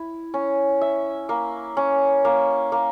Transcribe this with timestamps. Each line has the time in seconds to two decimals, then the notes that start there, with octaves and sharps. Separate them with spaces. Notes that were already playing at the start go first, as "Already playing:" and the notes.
Already playing: E4
0.34 C#4
0.81 E5
1.29 A#3
1.77 C#4
2.25 A#3
2.72 A#3